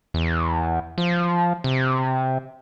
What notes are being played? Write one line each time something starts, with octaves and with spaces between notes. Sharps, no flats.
E2
F3
C3